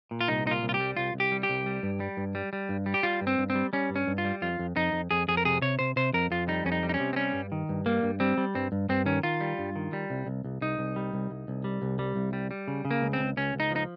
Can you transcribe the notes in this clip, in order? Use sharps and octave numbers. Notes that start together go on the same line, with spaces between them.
A#2
F4
C2 D#4
A#2 D#4
F4
C2
F4
G4
G3
C2 F4
C2
G4
G3
G4
C2
G3
G2
G3
G2
G3
G3
G2
G3
G4
G3 F4
G2
C4
G2
C4
G3
G3 C#4
G2
C#4
G2
F4
G3
F2 F4
F2
F2 D#4
F2
F2 G#4
F2 G#4
A#4
C3 G#4
C3 C#5
C3 C5
C3 C5
F2 A#4
F2 F4
G3 D#4
F2 C#4
D#4
G3
D#4
C#4
C3
C4
G3 C#4
G2
D#3
G2
G3 A#3
G2
G3 C4
G3
G2 C4
G2
G2 C4
D#3 C#4
D#3 F4
G3
G2
D#3
G3
C2
C2
C2
C2 D#4
C2
G3
C2
C2
C2
G3
C2
G3
C2
G3
G3
C#3
C#3
A#3
C#2
C4
C#2
C#2 C#4
C#2 D#4
F3
D#4